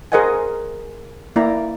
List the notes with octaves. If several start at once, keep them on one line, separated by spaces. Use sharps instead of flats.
G#4 A#4 C5 D#5 F#5 G#5
A#3 E4 D5 A#5